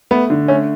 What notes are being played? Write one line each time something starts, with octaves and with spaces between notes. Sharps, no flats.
A3 B3
D3
A3 C#4